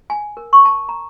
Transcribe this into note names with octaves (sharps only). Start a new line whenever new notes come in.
G#5
A#4
C#6
A5
A#5